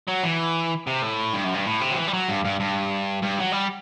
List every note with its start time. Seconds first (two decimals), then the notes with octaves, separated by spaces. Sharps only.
0.08 F#3
0.24 E3
0.87 C3
1.02 A2
1.34 G2
1.45 F#2
1.54 G2
1.66 A2
1.81 C3
1.92 F#3
1.97 E3
2.08 G3
2.14 F#3
2.29 G2
2.44 G2
2.60 G2
3.23 G2
3.39 F#3
3.52 G3